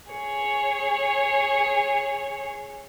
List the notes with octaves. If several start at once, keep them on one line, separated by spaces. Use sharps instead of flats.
G#4 C#5